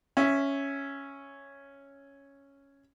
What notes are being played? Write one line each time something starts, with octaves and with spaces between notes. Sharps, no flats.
C#4 E5